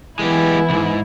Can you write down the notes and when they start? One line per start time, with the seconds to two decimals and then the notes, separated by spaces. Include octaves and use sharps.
0.19 E3 G#3 B3 E4 G4 G#5
0.70 C2 G#2